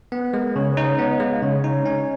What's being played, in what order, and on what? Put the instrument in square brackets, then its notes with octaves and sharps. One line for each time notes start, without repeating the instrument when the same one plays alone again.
[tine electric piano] B3 [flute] B4
[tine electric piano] G#3 [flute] A#4
[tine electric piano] C#3 [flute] C#5
[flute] B4
[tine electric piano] D#4
[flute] C#5
[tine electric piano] B3 [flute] C#5
[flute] D#5
[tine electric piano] G#3 [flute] F5
[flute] F5
[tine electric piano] C#3 [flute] C#5
[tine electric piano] D#4
C#4